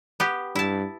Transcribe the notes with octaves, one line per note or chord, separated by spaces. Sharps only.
B3 G4
G2 E4 A5